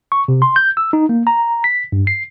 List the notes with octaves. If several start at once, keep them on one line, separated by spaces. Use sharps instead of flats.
C#6
C3
C6
G6
E6
D#4
A#3
A#5
B6
G2
C7